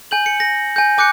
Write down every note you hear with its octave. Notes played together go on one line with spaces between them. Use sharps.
G#5 G6 F#7
C#7
A#6
G#5 G6
G#5 D6 F#6 G6 C#7